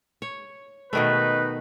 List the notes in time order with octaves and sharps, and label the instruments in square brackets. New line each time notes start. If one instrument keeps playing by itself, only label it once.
[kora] C#5
[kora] B2 D#3 A3 [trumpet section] D#4 B4